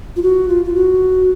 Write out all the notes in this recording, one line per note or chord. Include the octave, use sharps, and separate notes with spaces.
F4
F#4
F4
F4
F#4